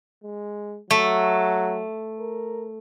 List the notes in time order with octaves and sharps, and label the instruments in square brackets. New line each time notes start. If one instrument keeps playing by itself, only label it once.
[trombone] G#3
[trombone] F#3 [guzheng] A3
[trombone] A#4